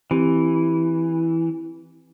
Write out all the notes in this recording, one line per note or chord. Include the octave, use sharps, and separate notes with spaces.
E3 C4 G4